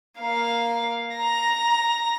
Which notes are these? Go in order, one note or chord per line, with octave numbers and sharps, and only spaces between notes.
A#3 F5
A#5 A#6